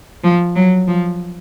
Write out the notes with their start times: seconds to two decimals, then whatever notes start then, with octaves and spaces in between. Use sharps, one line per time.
0.24 F3
0.56 F#3
0.88 F3